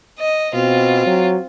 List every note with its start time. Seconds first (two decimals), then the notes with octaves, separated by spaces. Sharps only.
0.19 D#5
0.54 B2 C4 F4
1.06 F#3